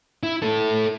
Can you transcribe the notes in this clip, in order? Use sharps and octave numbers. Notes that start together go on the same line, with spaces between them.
E4
E4 A4